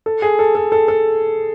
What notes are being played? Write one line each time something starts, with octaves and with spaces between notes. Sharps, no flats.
A4
G#4
A4
A4
A4
A4